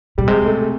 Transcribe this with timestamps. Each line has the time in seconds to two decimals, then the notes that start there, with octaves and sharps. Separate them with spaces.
0.18 B2 G3
0.27 C3 G#3
0.46 A3